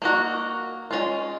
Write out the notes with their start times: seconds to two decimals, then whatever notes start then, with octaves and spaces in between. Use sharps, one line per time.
0.02 A#3 D#4 F#4
0.91 G#3 C#4 F4